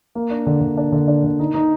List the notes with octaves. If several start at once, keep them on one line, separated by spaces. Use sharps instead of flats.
A#3
D4
D3
D3
D4
D3
D4
D3
D#4
D#4